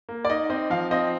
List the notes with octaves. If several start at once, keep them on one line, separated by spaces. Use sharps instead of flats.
A#3
D5
D#4 D#5
C4 D#5
F3 F5
C4 D#5